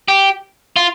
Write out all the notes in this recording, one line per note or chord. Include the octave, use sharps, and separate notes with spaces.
G4
F4